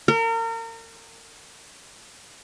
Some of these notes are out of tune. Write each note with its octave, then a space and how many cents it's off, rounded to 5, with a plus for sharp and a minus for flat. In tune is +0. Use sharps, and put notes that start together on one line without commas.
A#4 -35